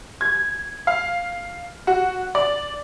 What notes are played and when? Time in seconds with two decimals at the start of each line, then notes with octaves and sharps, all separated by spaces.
0.21 G#6
0.87 F5
1.87 F#4
2.35 D5